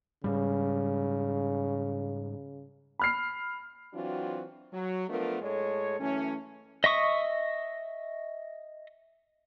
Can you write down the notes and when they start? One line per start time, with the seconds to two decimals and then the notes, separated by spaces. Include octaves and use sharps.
0.24 G#2 C#3 G3
2.99 B5 F6 C7
3.94 E3 F#3 C4 D4 F4 F#4
4.73 F#3
5.09 F3 A3 B3 D4 F4 A#4
5.42 A2 G#3 A4 C#5
6.00 F#2 E3 A3 C#4
6.84 D#5 E5 C#6 D#6